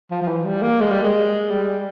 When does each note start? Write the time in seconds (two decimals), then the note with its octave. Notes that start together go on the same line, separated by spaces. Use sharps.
0.11 F3
0.22 F3
0.28 E3
0.45 G3
0.62 A#3
0.81 G#3
0.91 G3
1.03 G#3
1.51 G3